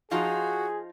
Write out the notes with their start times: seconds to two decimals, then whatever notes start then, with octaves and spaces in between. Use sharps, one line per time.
0.11 F3 D#4 F4 F#4 G#4